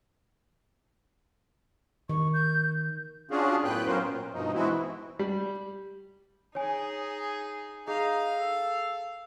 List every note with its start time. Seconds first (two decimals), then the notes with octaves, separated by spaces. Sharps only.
2.09 D#3 C#6
2.34 G6
3.31 C#4 D4 F4 F#4 G#4
3.64 F#2 A2 B3 B4 G5 F#6
3.87 F#3 B3 C#4 F4 A#4 C5
4.06 A#2
4.34 G2 B2 F3 D#4
4.54 E3 G#3 B3 C4 E4 F#4
5.19 G3
6.55 D#4 G#4 C#5 G#5
7.88 D#4 G#4 F5
8.39 A4